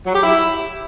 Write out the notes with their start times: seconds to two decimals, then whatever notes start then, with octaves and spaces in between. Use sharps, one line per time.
0.06 F#3
0.14 G4
0.23 E4